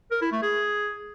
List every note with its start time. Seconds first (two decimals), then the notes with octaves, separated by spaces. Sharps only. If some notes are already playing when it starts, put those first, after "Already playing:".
0.11 A#4
0.22 E4
0.32 A3
0.42 G#4